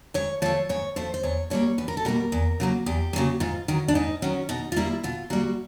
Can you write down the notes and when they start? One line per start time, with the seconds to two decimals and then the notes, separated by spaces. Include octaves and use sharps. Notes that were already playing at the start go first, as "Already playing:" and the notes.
0.14 G#2 C#5
0.42 F3 A3 C#5
0.69 G#2 C#5
0.96 F3 A3 C5
1.14 C5
1.23 E2 C#5
1.50 B2 G3 A#3 C#5
1.78 E2 B4
1.88 A#4
1.97 A4
2.05 B2 G3 A#3 A#4
2.32 E2
2.60 C#3 F#3 A#3
2.86 E2 G4
3.13 C#3 F#3 A#3
3.40 G#2 F4
3.68 D#3 F#3
3.88 D4
3.95 G#2 D#4
4.22 D#3 F#3 C#4
4.49 B2 D#4
4.72 F4
4.76 G3 A#3 E4
5.03 B2 F4
5.30 G3 A#3 F#4